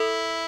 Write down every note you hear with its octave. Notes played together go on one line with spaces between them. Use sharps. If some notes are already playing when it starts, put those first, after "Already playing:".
Already playing: E4 A4